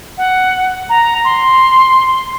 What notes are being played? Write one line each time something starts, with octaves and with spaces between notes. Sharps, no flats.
F#5
A#5
C6